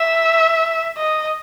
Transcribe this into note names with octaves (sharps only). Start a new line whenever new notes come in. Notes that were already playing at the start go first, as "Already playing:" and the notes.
Already playing: E5
D#5